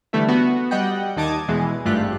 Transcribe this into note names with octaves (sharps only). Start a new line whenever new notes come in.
D3 E3 G3 A3 E4
B3 F#4
G3 D#5 F#5 G5
D#2 D#4 A5 D6 D#6 G#6
E2 B2 E3 G#3
G#1 G2 A3 F4 G4 F#6